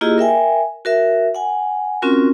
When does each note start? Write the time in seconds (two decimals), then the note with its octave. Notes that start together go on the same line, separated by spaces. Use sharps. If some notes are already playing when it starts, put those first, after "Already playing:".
0.01 A#3 E4 F4 G4 G#4 D#5
0.18 A#4 E5 G5 G#5
0.85 F#4 A#4 E5
1.35 F#5 G#5
2.02 C4 C#4 F4 F#4 A#4